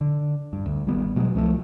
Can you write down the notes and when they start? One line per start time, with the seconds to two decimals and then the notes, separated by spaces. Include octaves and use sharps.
0.01 D3
0.53 G2
0.66 D2
0.87 G#1 D#3 G3 B3
1.16 B2 F#3 G#3
1.35 C2 F3 G#3 A3